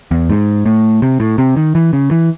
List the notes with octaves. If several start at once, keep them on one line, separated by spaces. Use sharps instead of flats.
E2
G#2
A2
C3
A2
C3
D#3
E3
C#3
E3